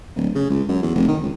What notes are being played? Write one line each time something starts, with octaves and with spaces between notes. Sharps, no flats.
D1
C#3
C#2
F#2
E2
F1
D#3
C#2